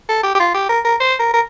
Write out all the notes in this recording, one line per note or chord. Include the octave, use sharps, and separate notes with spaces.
A4
G4
G4
F4
G4
A#4
A#4
C5
A#4
A#4